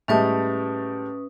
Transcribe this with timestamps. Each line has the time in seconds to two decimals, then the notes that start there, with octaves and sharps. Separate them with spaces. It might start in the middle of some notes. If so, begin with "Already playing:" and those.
0.08 A2 G3 G#3 C#4 B4 E5 A5 D#6